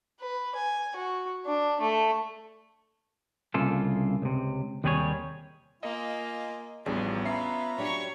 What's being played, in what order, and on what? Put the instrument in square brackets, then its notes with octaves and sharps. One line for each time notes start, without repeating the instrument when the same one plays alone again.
[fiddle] B4
G#5
F#4
D4
A3
[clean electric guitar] C2 C#3 A#3 F4 A4
C#2 C3
D#2 C3 G3 G#4 B4 C#5
[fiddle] A#3 [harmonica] F4 G#5 [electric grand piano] D#5
[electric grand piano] A1 E2 G3 [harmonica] F3 F4 [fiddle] B3 [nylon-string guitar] D4 G#4
[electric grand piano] C#4 E5 C7 [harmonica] F4 A#5 B5
[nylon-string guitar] F#3 D4 G4 [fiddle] C#5 C#6